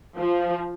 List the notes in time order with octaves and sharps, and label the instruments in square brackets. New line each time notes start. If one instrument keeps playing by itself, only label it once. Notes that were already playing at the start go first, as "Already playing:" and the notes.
[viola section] F3